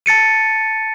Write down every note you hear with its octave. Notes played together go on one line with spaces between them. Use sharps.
A5 A6 C#7 D#7